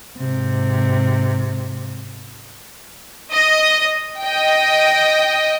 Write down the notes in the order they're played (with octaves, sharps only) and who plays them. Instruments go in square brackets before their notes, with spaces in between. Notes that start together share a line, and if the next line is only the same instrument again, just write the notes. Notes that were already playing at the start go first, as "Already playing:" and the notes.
[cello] G#2 C3
[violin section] D#5
D#5 G5